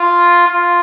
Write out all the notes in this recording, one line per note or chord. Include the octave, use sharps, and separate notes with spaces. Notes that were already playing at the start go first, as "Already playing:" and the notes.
Already playing: F4
F4